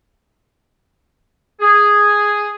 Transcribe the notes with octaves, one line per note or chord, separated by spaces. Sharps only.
G#4